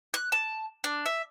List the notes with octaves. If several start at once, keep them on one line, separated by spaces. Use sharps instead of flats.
F#6
A5
D4
E5